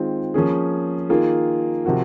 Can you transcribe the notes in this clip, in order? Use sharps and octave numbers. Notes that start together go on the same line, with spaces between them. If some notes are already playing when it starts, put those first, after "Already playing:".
Already playing: D#3 G#3 C4 F4
F3 A#3 C#4 G#4
D#3 A#3 F4 G#4
C3 F3 C4 F#4 A#4